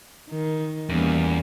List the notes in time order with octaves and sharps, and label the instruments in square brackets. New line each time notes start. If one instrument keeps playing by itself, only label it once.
[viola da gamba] D#3
[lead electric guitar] E2 [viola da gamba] G3 A#3 C#4